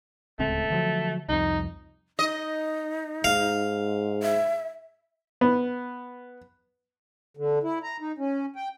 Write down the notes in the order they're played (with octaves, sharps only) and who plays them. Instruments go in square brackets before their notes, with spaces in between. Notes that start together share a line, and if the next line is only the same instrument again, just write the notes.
[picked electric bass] D1 C#2 C4 [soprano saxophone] A3
[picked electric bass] D3 F3 F#3
[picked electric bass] C2 F2 [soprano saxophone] D#4
[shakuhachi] D#4 [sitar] D#5
[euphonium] G#2 [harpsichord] F5
[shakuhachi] E5
[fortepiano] B3
[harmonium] D3
E4
A#5
D#4
C#4
G5